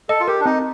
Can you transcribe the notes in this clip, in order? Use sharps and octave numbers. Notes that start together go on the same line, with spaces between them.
A4 D#5
F4
G4 A#4
D4
C4 D#4